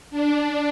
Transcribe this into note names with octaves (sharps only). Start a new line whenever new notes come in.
D4